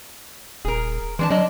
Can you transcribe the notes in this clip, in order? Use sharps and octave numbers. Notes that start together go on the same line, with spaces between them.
D#1 G#4 A#4
E3 G#3 D4 A5
F#3 D4 D#5